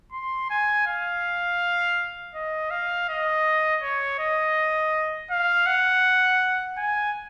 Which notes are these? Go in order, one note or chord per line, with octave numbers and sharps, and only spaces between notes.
C6
G#5
F5
D#5
F5
D#5
C#5
D#5
F5
F#5
G#5